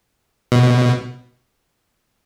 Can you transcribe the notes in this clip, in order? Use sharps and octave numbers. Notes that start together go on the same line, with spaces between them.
B2